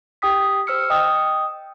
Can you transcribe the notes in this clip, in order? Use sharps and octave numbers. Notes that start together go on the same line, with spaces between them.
G4 G5 D#6 B6
C5 E6 F6 C#7
D#5 G5 D#6